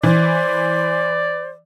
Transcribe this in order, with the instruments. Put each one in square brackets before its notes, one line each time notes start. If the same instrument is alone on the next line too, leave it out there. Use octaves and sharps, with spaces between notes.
[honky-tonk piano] E3 [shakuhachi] C5 [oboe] D5